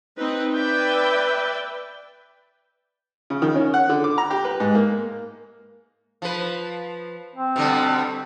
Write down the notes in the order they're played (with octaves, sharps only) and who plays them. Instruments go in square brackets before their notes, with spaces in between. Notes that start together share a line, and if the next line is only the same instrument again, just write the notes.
[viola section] C4 D#4 B4
B4 D5 E5 G5
[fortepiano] C#3
D#3
C#4
F#5
D3
D6
A#5
G4
B4
G#2
A#3
[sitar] F3 B4
[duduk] C4
[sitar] B2 D3 G3